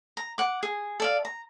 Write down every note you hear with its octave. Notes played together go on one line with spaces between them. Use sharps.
A#5
F#5 D6
G#4
A4 D5 F5
A#5